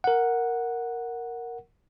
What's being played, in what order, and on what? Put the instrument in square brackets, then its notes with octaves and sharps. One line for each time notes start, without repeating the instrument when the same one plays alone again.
[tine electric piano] A#4 F#5